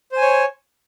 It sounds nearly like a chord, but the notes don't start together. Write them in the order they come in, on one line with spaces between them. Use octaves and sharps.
C5 G#5 C#5